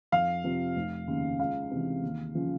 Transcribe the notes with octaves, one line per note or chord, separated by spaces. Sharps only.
F2 F5
C3 F3
F1
D#2 C#3
C#2 F5
C3 E3
D#2
C#3 F3